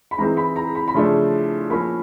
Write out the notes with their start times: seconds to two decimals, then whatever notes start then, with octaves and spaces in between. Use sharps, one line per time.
0.11 B5
0.18 E3 G#3 C4 D#4 A#5
0.37 B5
0.56 A#5
0.75 B5
0.88 B5
0.94 C#3 F3 A3 D4 C6
1.70 F3 A#3 C#4 B5